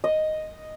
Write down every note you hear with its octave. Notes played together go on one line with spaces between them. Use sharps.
D#5